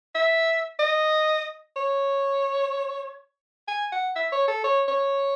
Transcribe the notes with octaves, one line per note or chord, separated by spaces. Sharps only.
E5
D#5
C#5
G#5
F#5
E5
C#5
A4
C#5
C#5